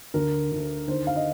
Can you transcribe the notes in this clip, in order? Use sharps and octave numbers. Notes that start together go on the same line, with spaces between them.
D2 D3 A#4
D2 D3
D#2 D3 C5
F5
D#5